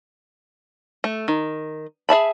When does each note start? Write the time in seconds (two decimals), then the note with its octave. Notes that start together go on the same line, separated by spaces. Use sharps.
1.04 A3
1.28 D#3
2.09 G#4 E5 A5 B5